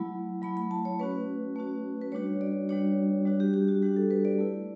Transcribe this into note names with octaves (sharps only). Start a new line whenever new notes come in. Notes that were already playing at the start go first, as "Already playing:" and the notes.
Already playing: F#3 A3 E4 B5
F#3 A3 E4 B5
B5
A5
C#5
A3 C#4 F#4 B4
A3 C#4 F#4
B4
G3 D4 F#4 C#5
D5
G3 D4 F#4 C#5
G3 D4 F#4
G4
G4
F#4
G3 D4 F#4 G4
A4
B4
D5
A3 E4